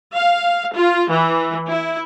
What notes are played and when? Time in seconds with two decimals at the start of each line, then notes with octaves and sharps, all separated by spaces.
0.15 F5
0.75 F4
1.09 E3
1.68 E4